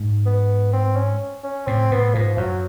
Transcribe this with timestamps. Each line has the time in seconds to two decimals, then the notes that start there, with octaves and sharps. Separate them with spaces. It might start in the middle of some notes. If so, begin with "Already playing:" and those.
Already playing: G#2
0.26 B3
0.73 C4
0.96 C#4
1.44 C#4
1.67 A2 C4
1.91 A2 B3
2.14 G#2 F3
2.37 F#2 F#3